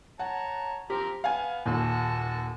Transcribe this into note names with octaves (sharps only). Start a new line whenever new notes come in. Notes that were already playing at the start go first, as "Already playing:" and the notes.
C#5 F#5 A5 A#5
F3 C4 G4 A#4
B3 F5 F#5 G#5
D#1 D#2 F#4 A4 A5